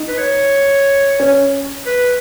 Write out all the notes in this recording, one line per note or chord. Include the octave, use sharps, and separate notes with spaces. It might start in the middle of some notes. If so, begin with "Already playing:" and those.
Already playing: D#4
B4
C#5
C#4
B4